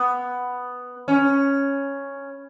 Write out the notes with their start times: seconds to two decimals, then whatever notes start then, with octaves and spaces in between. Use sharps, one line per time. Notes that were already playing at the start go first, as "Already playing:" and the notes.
Already playing: B3
1.08 C#4